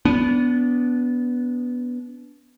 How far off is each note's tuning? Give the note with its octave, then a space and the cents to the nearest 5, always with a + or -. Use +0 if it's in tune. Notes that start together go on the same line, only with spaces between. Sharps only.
B3 +0 D4 -25